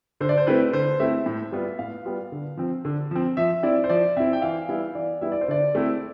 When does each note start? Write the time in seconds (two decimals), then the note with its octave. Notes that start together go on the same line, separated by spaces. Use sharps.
0.20 D3 C5
0.29 D5
0.37 C5
0.47 A3 C4 E4 B4
0.73 D3 C5
1.00 A3 C4 E4 E5
1.26 A2
1.52 G3 B3 F4
1.79 A2 F5
2.05 G3 B3 F4
2.32 D3
2.57 F3 C4
2.85 D3
3.11 F3 C4
3.37 F3 E5
3.63 C4 E4 D5
3.84 C5
3.89 F3 D5
4.17 C4 E4 E5
4.33 G5
4.42 E3 F5
4.69 G3 B3 E4 F5
4.95 E3 D5
5.21 G3 B3 E4 E5
5.32 D5
5.41 C5
5.48 D3 D5
5.75 A3 C4 E4